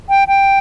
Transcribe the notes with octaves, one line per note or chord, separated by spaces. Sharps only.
G5
G5